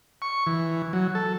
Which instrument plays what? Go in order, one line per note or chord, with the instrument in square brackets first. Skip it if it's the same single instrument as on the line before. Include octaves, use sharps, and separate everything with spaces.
[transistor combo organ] C#6
E3
F#3
A4